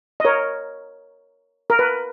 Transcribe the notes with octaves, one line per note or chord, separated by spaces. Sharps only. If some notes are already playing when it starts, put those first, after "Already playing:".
D#5
A#4 C#5
A#4
B4